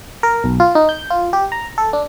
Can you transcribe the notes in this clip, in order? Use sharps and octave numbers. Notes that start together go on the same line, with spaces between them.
A#4
B1
F4
D#4
G6
F4
G4
A#5
A4
D4